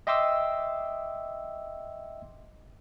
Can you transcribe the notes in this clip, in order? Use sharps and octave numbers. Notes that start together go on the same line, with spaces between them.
D#5 E5 G5 C6 D6 E6